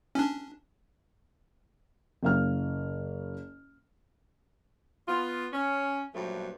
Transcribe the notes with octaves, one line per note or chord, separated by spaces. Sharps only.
C#4 D4
F#1 F5 F6
B3 F4
C#4
G2 A#2 F3 F#3 A3